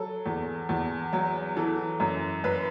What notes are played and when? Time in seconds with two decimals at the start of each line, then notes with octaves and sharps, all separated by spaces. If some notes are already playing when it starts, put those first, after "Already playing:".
Already playing: F#3 A4
0.26 E2
0.69 E2
1.13 F#3
1.56 E3 A4
2.00 F#2
2.44 F#2 B4